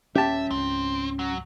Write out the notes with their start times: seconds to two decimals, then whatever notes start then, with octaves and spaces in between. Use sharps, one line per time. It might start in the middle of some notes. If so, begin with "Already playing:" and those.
0.15 D#1 D#2 C#4 G4 E5 A5
0.51 C#2 G#2 C4
1.19 F#3